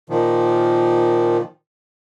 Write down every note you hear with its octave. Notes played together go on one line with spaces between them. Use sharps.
A#2 D#3 F3